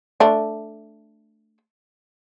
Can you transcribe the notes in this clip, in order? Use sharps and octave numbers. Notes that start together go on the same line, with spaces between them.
A3 D4